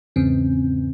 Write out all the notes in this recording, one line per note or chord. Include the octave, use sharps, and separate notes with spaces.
E2 G#2 C#3 C4